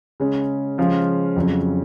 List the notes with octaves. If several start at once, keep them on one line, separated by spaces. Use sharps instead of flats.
C#3 G#3 C#4
C#3 F3 G#3 C#4 F4
F2 C#3 F#3 C#4